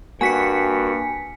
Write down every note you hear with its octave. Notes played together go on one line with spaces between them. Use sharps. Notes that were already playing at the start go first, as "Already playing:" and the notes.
G2 A#3 F#4 G#5 B6 C#7